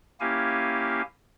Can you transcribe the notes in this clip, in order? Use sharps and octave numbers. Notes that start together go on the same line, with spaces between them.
A#3 C#4 E4 G4 F5 G#5